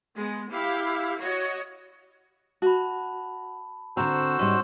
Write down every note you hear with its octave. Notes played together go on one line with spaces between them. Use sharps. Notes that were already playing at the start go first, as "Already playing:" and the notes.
G#3 B3
E4 G4 F5
F#4 C#5 D#5
F#4 A5 B5
D3 C4 F#4 C5 A#5 E6
G#2 G3 C#4 D5 C6